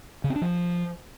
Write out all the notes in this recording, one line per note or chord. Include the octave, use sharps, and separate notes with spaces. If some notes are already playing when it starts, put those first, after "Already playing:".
C#3
C4
D4
F3